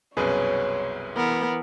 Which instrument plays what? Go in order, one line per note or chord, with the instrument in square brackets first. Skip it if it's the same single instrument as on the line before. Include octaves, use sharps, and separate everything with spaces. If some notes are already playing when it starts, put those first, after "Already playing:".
[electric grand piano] C2 F#2 B2 [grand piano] G#4 B4 [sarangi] C#5
[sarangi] E3 [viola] B3 A#4